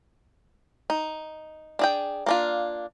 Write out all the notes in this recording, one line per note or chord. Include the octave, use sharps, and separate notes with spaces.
D#4
D4 G#4 G5
A#3 D4 F4